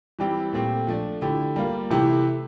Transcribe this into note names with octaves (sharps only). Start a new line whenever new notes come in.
E3 G3 C4 E4 G4
A#2 A3 C4 G4
F3 A3 D4
D3 A3 E4 G4
G3 A#3 F4
C3 E3 A3 E4 G4